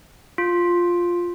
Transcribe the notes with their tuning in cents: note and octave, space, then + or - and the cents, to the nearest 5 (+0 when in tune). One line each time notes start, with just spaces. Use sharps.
F4 +5